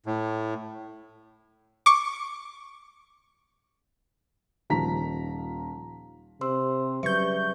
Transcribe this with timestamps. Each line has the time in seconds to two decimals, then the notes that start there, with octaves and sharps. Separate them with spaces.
0.06 A2
1.86 C#6 D6
4.70 D#1 D#3 F3 A#5 B6
6.41 C3 C5 C6 E6
7.03 C#3 F#3 G3 B4 E5 C#6 G6